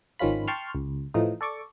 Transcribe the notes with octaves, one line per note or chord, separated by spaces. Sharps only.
G#1 D#3 F3 C#4 F4 B5
G5 A5 C6 C#6 F6
C#2
A2 E3 F3 D#4
A4 D5 C#6 D6